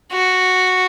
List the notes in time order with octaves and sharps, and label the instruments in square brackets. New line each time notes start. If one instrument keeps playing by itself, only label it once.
[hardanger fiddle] F#4